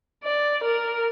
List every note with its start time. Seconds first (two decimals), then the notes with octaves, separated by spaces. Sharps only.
0.23 D5
0.63 A#4